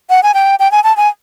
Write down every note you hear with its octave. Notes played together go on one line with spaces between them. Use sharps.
F#5
G#5
G5
G5
G#5
A5
G#5